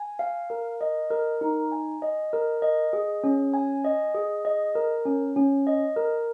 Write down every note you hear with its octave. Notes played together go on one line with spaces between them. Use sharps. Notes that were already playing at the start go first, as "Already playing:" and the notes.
Already playing: G#5
F5
A#4
D#5
A#4
D#4
G#5
D#5
A#4
D#5
G#4
C#4
G#5
D#5
G#4
D#5
A#4
C#4
C#4
D#5
A#4